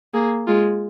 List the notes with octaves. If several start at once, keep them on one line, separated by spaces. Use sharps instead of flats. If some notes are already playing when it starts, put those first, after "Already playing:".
A#3 G#4
G#3 F4